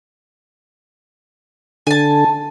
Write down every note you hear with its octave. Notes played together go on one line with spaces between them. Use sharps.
D3 G#5 A5